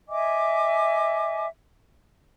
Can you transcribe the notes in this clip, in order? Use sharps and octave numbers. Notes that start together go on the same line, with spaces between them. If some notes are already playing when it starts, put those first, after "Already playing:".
D#5 E5 G#5 D6